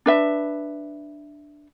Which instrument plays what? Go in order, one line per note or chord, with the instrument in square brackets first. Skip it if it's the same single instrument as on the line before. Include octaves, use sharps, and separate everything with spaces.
[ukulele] D4 B4 E5